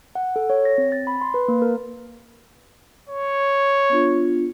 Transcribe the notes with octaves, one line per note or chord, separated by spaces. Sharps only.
F#5
A4
C#5
A#6
C4
A6
B5
C6
B4
A#3
A#4
C#5
B3 D4 F4